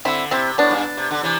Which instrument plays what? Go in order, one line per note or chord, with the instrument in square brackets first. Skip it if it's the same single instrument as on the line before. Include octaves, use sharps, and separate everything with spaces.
[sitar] D3 [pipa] C4 E4
[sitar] C3 [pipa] C4 E4
[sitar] A2 [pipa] B3 D4
[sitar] G2
C3
D3
C3 E3